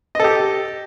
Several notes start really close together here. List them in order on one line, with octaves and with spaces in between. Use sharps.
D#5 A4 G4